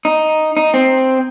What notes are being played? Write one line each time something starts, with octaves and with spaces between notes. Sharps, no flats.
D#4
D#4
C4